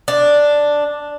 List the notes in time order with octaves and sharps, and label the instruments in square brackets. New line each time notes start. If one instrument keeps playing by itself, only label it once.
[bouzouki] D4